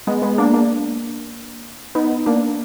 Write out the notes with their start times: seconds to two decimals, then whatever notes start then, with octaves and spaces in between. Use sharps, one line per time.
0.07 G#3 B3
0.22 G#3 B3
0.38 A#3 D4
0.54 A#3 D4
1.95 B3 D#4
2.26 A#3 D4